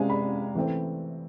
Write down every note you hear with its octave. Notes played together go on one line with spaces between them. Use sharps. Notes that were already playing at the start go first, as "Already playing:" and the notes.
Already playing: C3 G#3 C4 F5 G#5
B5
E3 A3 C4